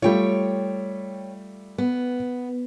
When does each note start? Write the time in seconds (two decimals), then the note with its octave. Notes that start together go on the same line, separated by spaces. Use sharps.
0.02 G3 A3 F4 C#5 G5
1.78 B3